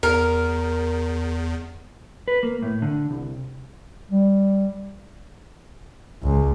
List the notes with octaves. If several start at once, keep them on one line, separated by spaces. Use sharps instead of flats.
E2 A#4
B4
A#3
A2
D3
C2
G3
C#2